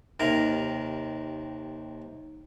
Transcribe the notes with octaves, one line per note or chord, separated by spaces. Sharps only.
D#2 C3 A#4 A#5